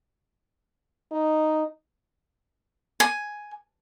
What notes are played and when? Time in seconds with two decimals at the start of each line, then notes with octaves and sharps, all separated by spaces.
1.12 D#4
3.00 G#5